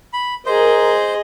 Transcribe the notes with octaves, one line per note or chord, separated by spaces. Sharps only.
B5
G#4 A#4 C5 D#5